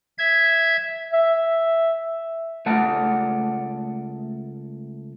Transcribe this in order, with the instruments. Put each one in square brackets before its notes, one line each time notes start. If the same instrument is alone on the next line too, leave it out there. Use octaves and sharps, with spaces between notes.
[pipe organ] E5 G#6
[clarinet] E5
[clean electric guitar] C#2 A3 F#5 A5